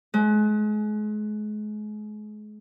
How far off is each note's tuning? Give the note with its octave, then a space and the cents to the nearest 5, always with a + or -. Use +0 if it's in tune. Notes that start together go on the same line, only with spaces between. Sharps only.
G#3 +35